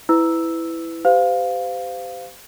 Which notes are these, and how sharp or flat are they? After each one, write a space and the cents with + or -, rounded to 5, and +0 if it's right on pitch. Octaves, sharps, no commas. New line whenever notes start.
E4 +0 B4 +25 E6 +0
G4 +0 C5 -35 F5 +0